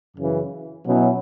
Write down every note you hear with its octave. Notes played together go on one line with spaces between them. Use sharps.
F#2 C#3 E3
B2 F#3 C#4 E4